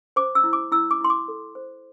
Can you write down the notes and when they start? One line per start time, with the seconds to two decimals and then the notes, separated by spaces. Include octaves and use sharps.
0.16 C5 D6
0.35 E6
0.44 E4
0.53 D6
0.72 E4 E6
0.91 D6
1.01 E4 C6
1.10 D6
1.28 A4
1.55 C5